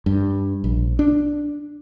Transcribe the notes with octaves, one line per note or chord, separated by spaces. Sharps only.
G2
A#1
D4